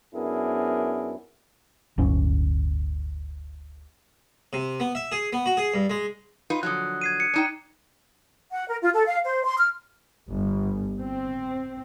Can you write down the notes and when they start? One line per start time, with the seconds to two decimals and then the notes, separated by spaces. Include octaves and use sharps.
0.15 F#2 B3 D4 E4 G#4 A#4
1.98 D1 G1 C#4
4.53 C3
4.80 B3
4.95 E5
5.12 G#4
5.33 B3
5.46 F#4
5.57 G#4
5.74 G2
5.90 G#3
6.50 D#4 F4 B4
6.63 D3 F3 F#3 D#6 F#6
7.01 G#6 C7 D#7
7.20 C#7
7.34 D4 D#4 G5
8.52 F#5
8.68 A#4
8.81 F4
8.94 A4
9.07 F5
9.24 C5
9.45 C6
9.57 F6
10.31 G1
11.02 C4